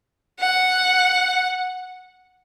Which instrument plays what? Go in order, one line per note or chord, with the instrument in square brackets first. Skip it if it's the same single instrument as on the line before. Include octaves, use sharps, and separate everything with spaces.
[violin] F#5